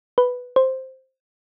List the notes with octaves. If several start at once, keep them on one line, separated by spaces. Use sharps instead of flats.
B4
C5